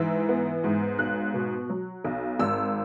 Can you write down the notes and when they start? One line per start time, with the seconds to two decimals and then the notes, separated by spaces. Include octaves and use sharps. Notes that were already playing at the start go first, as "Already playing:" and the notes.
Already playing: G#2 E3 E6
0.29 B3
0.64 G#2
0.99 B1 F#6
1.34 B2
1.70 F#3
2.04 B1
2.39 G#1 E6